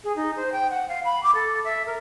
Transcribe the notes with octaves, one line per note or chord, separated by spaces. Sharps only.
G#4
D#4
C5
G5
F#5
F5
B5
D6
A4
E5
A#4